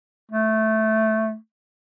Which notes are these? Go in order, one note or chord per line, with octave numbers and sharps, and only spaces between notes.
A3